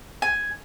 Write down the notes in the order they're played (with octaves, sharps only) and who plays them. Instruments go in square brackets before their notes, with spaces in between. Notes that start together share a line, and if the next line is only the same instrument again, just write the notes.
[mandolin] G#5